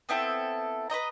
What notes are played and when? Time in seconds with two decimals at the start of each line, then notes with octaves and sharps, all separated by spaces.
0.09 B3 C4 E4 A4
0.90 B4 C5 D#5 A#5